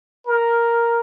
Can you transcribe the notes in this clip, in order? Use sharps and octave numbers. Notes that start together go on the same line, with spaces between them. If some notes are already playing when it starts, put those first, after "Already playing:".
A#4